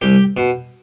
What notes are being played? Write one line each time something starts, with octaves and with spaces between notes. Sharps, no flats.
C2 G4
B2